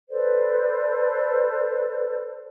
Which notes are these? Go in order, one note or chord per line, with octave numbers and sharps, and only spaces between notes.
A4 B4 C5 D5